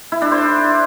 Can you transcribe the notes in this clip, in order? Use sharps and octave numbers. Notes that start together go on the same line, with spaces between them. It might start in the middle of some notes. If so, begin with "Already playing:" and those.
E4
D4
C5